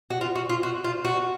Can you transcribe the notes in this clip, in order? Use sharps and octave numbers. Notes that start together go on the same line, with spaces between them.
F#4
F4
F#4
F4
F#4
F4
F#4